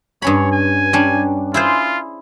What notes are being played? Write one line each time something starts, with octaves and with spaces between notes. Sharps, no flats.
G2 C#4 C#5 B5
G#5
G3 C#4 D4
E4 F4 G#4 C5